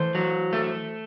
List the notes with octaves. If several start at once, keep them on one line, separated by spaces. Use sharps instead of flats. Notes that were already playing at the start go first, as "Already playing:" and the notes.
Already playing: E3 A3 C5
F#3
A3